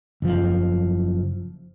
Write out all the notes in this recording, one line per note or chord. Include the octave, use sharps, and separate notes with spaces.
F#1 F3